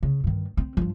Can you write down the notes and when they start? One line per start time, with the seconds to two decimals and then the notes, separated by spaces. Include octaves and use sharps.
0.03 C#3
0.24 G2 D#3
0.57 C4
0.77 G2 F3